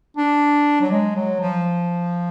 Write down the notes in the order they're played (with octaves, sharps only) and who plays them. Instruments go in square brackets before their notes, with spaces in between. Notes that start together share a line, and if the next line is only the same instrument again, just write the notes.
[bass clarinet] D4
F#3
G#3
F#3
F3